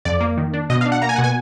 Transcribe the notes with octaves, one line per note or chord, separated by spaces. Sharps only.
F2 D5
A#3
D#3
D4
B2 D#5
F5
D4
F#5
A#3 A#5
G#5
B2 F#5
G#5